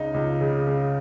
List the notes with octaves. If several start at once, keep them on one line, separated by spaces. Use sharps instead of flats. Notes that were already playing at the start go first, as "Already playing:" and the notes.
Already playing: C#2 C#3 D#4
C#2
C#3
C#3